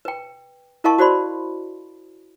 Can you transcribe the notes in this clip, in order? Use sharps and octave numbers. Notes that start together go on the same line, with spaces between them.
B4 G5
E4 A#4 D#5 F5 A5 C#6
F#4 C5 D5 B5 C6